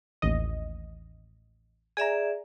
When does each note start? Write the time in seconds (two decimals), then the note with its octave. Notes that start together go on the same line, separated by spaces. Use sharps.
0.22 A1 D#2 D#5
1.97 G#4 D5 E5 G#5 A#5